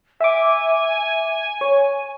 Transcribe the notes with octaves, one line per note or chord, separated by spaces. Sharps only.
E5 G#5 D6
C#5